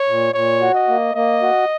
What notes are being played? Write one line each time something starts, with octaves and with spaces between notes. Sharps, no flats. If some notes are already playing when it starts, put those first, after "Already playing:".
Already playing: C#5
A#2
A#2 C#5
F#4
D#5
A#3
A#3 D#5
F#4